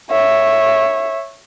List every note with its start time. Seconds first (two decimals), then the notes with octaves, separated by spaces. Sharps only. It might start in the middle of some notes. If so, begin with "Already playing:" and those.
0.10 C#5 E5